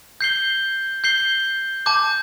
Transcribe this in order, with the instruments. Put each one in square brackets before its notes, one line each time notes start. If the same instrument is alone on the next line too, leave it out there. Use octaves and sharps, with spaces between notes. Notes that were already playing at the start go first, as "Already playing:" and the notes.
[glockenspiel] G6 C7 G7
G6 C7 G7
A5 D6 G6